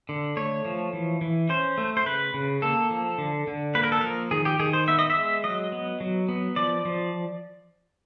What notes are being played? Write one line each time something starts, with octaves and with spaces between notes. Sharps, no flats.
D3
A3 C#5
F3
E3
E3
C#4 C5
A3
C5
C#3 B4
C#3
A#3 A4
F3
D3
D3
A#3 B4
A#4
A4
F3 A#4
D#3 G#4
G4
D#3 G#4
C5
B3 E5
D#5
E5
G#3
F#3 D#5
B3
F#3
B3
F3 D5
F3